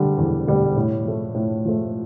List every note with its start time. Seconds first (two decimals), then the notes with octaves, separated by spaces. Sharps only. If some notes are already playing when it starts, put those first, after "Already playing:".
Already playing: D3 G3
0.17 E2
0.47 D3 G3
0.76 A2
1.05 F3 A3
1.34 A2
1.65 F3 A3